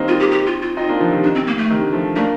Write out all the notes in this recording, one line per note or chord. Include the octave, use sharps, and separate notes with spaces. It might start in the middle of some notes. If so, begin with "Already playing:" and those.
Already playing: D#3 G3 A#3 C4 D#4
F4
G4
G4
F4
F4
C4 D#4 F4
A#3 D4
D3 F3
C3 D#3
D4
C4
A#3
A3
C3 D#3
D3
F3 A3
A3 A#3 D4